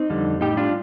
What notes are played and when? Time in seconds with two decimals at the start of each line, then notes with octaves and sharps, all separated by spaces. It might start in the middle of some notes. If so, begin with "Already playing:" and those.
Already playing: C4 D#4
0.10 F2 D3 G3
0.41 A2 G3 D#4 G4
0.57 D4 F4